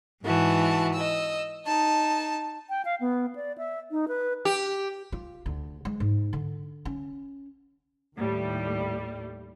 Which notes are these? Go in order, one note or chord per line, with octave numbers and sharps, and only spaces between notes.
G#2 E3 F#4 A5
D#5 E6
D#4 A5
G5
F5
B3
D5
E5
D#4
B4
G4
F4
D2
G#3
G#2
D3
C#4
D#2 A2 G3